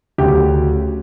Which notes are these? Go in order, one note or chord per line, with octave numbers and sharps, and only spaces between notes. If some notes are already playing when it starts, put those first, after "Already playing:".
D2 C#3 F#3 G4